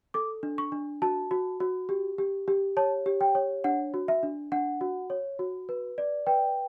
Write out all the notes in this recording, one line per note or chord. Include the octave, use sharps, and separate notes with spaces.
A4 D6
D4
C#6
D4
F#4 A5
F#4
F#4
G4
G4
G4
C#5 A5
G4
G5
C#5
D4 F#5
F#4
E5
D4
D4 F#5
F#4
C#5
F#4
B4
D5
B4 G5